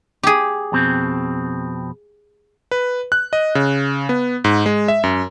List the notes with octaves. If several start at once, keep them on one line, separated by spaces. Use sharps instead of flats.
G4 G#4
F2 B2 C4
B4
F#6
D#5
C#3
B3
G#2
G#3
E5
F#2